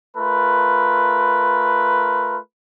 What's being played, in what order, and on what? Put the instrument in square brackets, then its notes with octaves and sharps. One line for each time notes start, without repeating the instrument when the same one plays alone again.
[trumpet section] A3 F4 A#4 B4